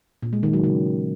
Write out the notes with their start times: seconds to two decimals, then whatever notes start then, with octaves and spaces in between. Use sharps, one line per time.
0.23 A#2
0.33 G#3
0.43 D#3
0.53 F#3
0.64 C#3